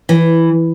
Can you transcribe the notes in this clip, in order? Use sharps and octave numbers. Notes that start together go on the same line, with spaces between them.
E3